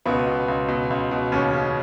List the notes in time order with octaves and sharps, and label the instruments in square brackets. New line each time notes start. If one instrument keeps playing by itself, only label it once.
[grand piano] C#2 B2 B3
B2
C#2
B2
C#2
B2
D#2 C#3 C#4
C#3